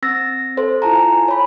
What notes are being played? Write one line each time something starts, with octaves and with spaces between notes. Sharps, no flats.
C4 E6 A6 A#6
A4 C5
E4 F4 A5 A#5
G#5
C#5 B5